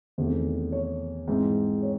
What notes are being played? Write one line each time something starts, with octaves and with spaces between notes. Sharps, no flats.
E2 C3 D#3 A3 C5
C#5
G#2 E3 C4
C#5